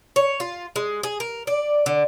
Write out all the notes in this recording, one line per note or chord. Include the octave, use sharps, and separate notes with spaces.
C#5
F4
G#3
G#4
A#4
D5
D3